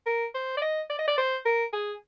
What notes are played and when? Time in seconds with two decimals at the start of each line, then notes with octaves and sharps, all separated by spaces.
0.06 A#4
0.35 C5
0.57 D5
0.62 D#5
0.90 D5
0.99 D#5
1.08 D5
1.18 C5
1.45 A#4
1.73 G#4